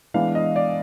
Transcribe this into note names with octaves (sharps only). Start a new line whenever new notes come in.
E3 G#3 B3 D4 F5
D#5
D5